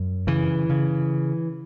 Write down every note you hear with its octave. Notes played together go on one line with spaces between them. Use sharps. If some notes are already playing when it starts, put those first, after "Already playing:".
Already playing: F#2
C#3 E3
C#3